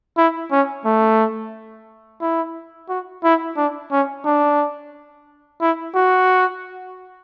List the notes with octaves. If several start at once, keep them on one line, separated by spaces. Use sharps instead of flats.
E4
C#4
A3
E4
F#4
E4
D4
C#4
D4
E4
F#4